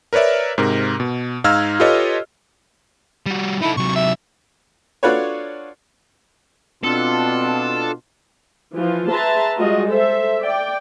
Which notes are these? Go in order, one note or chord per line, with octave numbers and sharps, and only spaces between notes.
A#4 B4 C#5 D5 E5
G#2 C3 A#4
B2
G#2 D#4 F5 E6 F6 G#6
F4 G4 A4 B4 C#5 D#5
G3 F#4
D#4 E4 A4
C3 F#3 C#6
E5
D4 F4 F#4 A4 B4 C#5
B2 C4 D4 F4 A4
E3 F3 F4
G#4 B4 E5 A5 A#5 C6
G3 G#3 F4 F#4 D#5
A4 C5 E5
D5 G5